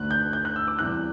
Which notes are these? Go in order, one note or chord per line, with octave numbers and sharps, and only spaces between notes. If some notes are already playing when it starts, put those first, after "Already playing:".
Already playing: D2 D3 A3 F#6
G6
G6
F#6
E6
D6
E2 C3 E3 G3 F#6